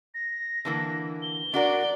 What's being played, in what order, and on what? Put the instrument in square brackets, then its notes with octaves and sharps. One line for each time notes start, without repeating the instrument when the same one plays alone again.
[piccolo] A#6
[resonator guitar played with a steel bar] D3 E3 A#3
[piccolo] G7
[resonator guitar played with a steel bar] D4 F#4 A#4 [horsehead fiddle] D5